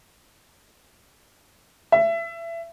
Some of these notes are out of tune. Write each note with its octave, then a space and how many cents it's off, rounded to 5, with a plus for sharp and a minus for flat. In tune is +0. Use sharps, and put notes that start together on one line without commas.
E5 +25